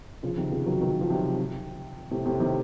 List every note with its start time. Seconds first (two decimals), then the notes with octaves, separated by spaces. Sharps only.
0.23 C#3 F3
0.37 C3 D#3
0.51 C#3 F3
0.66 D#3 F#3
0.81 D#3 F#3
1.01 F3
1.10 C3 D#3
2.11 A2 C3
2.25 A2 C3
2.40 C3 D#3